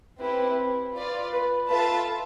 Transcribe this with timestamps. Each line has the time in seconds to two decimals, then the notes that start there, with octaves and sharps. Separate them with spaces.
0.20 C4 E4 G4 B4
0.95 F4 B4 D5
1.33 B4
1.69 F4 A4 B4 E5 A5